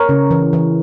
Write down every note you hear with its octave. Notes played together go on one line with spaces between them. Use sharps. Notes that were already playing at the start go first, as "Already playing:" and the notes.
Already playing: A#4 C#5
C#3
E3
E3